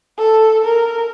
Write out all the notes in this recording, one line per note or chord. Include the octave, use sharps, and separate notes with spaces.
A4
A#4